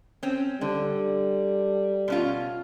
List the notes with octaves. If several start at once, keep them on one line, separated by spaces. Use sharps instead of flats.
C4 C#4
D3 G3
B2 C#4 F4